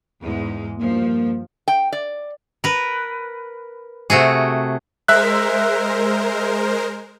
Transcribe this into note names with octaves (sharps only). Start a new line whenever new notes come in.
E2 G#2 G#3
G2 F3 A#3
G5
D5
A#4 B4
C3 A3 F#4 G#4
G#3 A#4 C5 E5 F#6